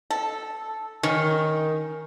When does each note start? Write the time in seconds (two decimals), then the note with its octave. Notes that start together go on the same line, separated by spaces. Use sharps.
0.10 A4
1.03 D#3 C#4